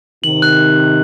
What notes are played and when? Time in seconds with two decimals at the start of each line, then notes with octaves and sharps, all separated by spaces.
0.24 C3 D#3 F#7
0.42 F#6